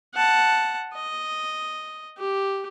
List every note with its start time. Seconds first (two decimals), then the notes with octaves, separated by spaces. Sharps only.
0.15 F#5 A5
0.94 D#5
2.18 G4